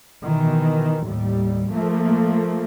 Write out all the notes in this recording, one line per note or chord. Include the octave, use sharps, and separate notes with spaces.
B2 D#3 E3
D#2 A2 G3
F3 A3 A#3